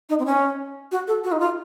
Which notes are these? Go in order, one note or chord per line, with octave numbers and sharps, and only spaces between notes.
D#4
C4
C#4
F#4
A4
F#4
D#4
F4